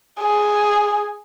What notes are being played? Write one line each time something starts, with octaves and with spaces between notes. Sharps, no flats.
G#4